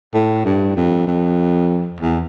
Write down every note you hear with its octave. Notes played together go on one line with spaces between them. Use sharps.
A2
G2
F2
F2
E2